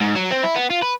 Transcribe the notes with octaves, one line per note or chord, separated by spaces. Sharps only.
G#2
F#3
C4
E4
B3
F4
B4